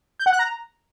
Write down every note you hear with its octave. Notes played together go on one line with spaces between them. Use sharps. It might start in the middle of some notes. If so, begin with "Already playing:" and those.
G6
F#5
F#6
A#5